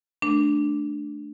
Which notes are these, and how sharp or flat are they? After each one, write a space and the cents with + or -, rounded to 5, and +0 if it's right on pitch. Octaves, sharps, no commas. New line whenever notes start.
A3 -20 D4 +0 A#4 -25